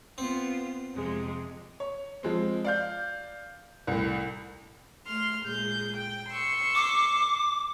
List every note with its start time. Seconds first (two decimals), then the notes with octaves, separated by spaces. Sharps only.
0.18 B3 C4 F4
0.95 F2 C3 G#3
1.80 C#5
2.23 F3 G#3 C4
2.65 D5 F5 G6
3.87 C2 A2
5.07 A3 C6 F6
5.44 A#2 G#3 G6
5.98 G5
6.31 C6 C#6 E6
6.75 D6